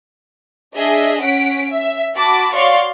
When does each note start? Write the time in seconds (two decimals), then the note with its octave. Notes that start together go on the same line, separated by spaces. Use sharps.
0.77 D4 G#4 D#5 E5
1.22 C#4 F#5 B6 D7
1.71 E5
2.16 F#4 A5 B5 D6
2.53 F#4 C#5 D5 F5 C6 C#6